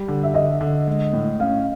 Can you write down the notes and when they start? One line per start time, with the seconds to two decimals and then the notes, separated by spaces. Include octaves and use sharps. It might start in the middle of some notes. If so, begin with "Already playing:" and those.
Already playing: G3
0.08 D3
0.23 E5
0.34 D3 D#5
0.61 D3
0.87 G#3
1.13 A2
1.40 C#4 F5